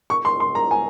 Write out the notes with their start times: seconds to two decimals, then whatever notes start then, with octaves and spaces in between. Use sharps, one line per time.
0.10 C#6
0.25 C6
0.40 C6
0.55 A#5
0.71 G#5